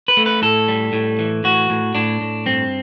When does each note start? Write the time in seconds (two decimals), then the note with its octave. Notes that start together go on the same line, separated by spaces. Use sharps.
0.08 B4
0.17 A3
0.26 B4
0.42 A2 A4
0.68 G3
0.93 A2
1.19 E3
1.44 A2 F#4
1.70 A2
1.95 A2 D4
2.21 A2
2.46 G2 C4